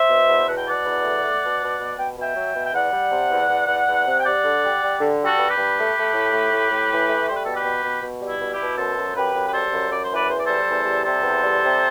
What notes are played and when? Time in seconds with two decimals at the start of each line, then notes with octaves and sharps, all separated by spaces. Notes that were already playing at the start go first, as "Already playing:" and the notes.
Already playing: C5 E5
0.10 B2
0.28 E2
0.47 B2 F#5
0.58 G5
0.67 B2 D5 F#5
0.85 E2
1.04 A3
1.23 A3
1.42 B2
1.60 B2
1.79 B2
1.98 B2 G5
2.17 B2 E5 G5
2.36 F#3
2.56 B2
2.65 G5
2.74 E2 D5 F#5
2.93 G3
3.12 C3
3.30 E2
3.49 E2
3.68 E2
3.87 E2
4.06 C3
4.20 G5
4.25 G3 D5 F#5
4.44 D3
4.62 G3
4.82 G3
5.00 D3
5.19 G3
5.25 F#4 A4
5.38 G2
5.50 G4 B4
5.57 G2
5.76 A3
5.95 A3
6.13 A2
6.32 A3
6.52 A2
6.70 A2
6.90 E3
7.08 A3
7.27 G3 C5
7.36 B4
7.46 B2 A4
7.55 G4 B4
7.64 B2
7.84 B2
8.02 B2
8.21 G3
8.27 E4
8.40 B2
8.52 E4 G4
8.59 B2
8.77 F#2 A4 C5
8.97 F#2
9.15 F#2 G4 B4
9.34 F#2
9.48 B4
9.53 G3 A4 C5
9.72 F#2
9.90 F#2 D5
10.03 C5
10.10 E3
10.15 B4 D5
10.28 E2 C5
10.38 D5
10.46 G3 A4 C5
10.66 E2
10.85 G3
11.04 C3 A4 C5
11.23 E2
11.42 G3
11.61 C3